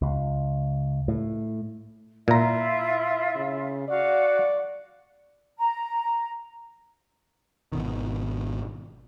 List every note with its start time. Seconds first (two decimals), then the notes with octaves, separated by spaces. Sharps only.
0.02 C#2
1.08 A2
2.28 A#2 E4 F4 E5 A#5
3.36 C#3
3.88 F#4 D5 F5
5.58 A#5
7.72 G#1 B2 D#3